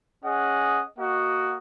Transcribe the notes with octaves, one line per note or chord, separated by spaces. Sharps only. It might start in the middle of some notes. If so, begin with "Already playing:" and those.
C#4 G#4 D#5 F#5
A#3 F#4 D#5 F#5